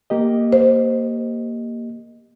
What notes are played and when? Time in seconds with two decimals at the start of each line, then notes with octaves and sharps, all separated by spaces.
0.10 A#3 G4 D#5
0.52 C5